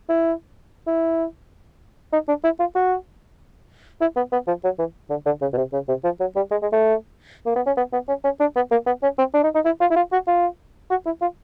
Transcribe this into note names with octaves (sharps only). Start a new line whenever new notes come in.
E4
E4
D#4
D4
E4
F4
F#4
E4
B3
B3
F3
F#3
E3
D3
D3
C#3
B2
C3
C#3
C3
F3
F#3
G3
G#3
G#3
A3
A#3
B3
C#4
B3
B3
C#4
C#4
D4
B3
A#3
B3
C#4
C4
D4
D#4
D#4
E4
F4
E4
F4
F#4
F4
F#4
E4
F4